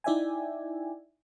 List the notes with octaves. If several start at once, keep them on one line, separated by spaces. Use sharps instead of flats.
D#4 E4 D5 E5 G5 G#5